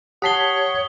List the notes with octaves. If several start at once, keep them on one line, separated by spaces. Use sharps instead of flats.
G4 C#5 F#5 A5 D#6 B6 C7 G7